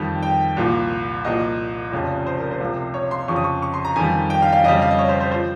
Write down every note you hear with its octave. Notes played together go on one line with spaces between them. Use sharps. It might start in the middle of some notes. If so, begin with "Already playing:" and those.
Already playing: F2 D#3 G3
G5
C2 A#2 F3
C2 A#2 F3 D#5
F1 F2 C#3 F3
C5
A#4
C5
C#2 C3 F3
C#5
C6
F2 C#3 F3 C#6
D#6
C#6
C#6
C6
A#5
F2 D#3 G3 G#5
G5
F5
F5
F2 C#3 G3 D#5
F5
D#5
C#5
C5
C5
F3 C5